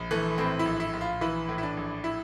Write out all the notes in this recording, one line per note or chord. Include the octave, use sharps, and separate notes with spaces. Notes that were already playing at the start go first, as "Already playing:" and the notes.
Already playing: A#1
E3 A3
A2 C4
E4
A#1
E4
A#1
F4
E3 E4
A2
E4
D4
A#1
E4